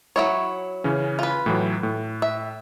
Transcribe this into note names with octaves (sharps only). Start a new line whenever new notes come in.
F#3 E4 C#5
C#3 E3 C#4
F4 B4
A2 E3 F#3
A2
E5